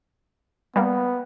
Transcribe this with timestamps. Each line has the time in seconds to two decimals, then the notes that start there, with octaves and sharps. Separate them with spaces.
0.76 G3 A#3 B3